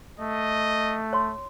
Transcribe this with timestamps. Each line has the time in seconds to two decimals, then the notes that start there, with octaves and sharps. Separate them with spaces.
0.20 A3 D#5
1.13 C#5 C6